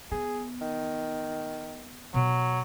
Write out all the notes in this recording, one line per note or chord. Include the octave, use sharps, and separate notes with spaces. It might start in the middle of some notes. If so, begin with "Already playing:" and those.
B3 G#4
D#3
B2 F#3